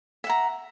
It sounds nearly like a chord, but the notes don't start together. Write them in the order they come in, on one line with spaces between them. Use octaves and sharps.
E5 F#5 A#5